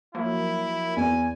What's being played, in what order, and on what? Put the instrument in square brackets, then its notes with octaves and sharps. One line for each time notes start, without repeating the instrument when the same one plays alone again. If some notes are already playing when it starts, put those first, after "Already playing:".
[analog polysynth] F3 F#3 A#3 [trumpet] E4
[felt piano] E2 [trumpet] G#5